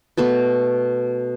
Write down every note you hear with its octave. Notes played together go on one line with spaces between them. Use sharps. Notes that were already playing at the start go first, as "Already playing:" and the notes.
B2 A3 B3